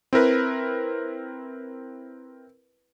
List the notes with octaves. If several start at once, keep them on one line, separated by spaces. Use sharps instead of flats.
C4 E4 A#4 B4